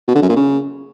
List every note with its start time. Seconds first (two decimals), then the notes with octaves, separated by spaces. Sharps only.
0.08 B2
0.15 D3
0.22 F#2
0.29 A#2
0.36 C#3